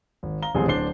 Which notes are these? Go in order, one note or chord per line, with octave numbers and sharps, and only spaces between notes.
G#1
F5 A#5 G7
D1 A1 G3 G#3 C4 G#4
D1 D4 C5 C7 G7